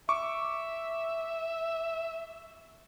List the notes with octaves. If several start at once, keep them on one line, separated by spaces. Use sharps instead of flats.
E5 C#6 D6